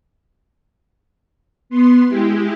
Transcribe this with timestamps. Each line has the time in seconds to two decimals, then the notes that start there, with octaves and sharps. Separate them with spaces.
1.70 B3 C6
2.09 G#3 E4 G4